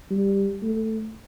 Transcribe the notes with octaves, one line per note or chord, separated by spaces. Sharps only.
G3
A3